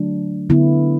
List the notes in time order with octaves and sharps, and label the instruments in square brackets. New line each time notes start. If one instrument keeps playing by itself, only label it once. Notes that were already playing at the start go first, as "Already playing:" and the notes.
Already playing: [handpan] D3 F#3 A3 D4
D3 B3 E4